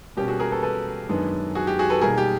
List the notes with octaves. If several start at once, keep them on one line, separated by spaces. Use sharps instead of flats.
B2 G3 A#3 C#4 G4
F#4 G#4
G#4 A#4
A4 B4
A4 B4
F#2 D#3 G#3 B3 D4
F#4 G#4
G4
F#4 G#4
A4 B4
B2 G3 A#3 D#4 G#4 A#4
G4